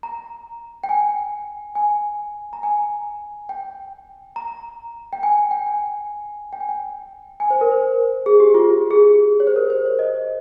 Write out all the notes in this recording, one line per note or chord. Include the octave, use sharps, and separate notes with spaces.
A#5
G5
G#5
G#5
A#5
G#5
G5
A#5
G5
G#5
G5
G#5
G5
G#5
G5
G#5
C5
A#4
C5
G#4
G4
F4
G4
G#4
C#5
C5
A#4
C5
C#5
D#5
C#5